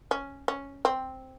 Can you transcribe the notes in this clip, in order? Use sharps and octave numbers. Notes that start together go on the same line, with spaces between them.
C#4
C#4
C4